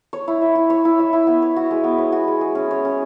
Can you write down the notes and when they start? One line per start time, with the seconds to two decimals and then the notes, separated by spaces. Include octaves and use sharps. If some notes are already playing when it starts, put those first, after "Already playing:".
0.13 C#5
0.28 E4
0.41 E5
0.55 E4
0.70 C#5
0.85 E4
0.99 E5
1.13 E4
1.27 B3
1.42 C#5
1.56 F#4
1.71 G#3
1.84 B3
1.98 C#5
2.12 F#4
2.28 G#3
2.41 G#4
2.55 C#4
2.71 C#5
2.85 C#4